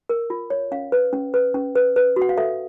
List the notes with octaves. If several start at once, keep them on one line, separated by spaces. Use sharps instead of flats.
A#4
F4
C#5
C#4 F5
B4
C#4
B4
C#4
B4
B4
F#4
F#5
F5
A4 E5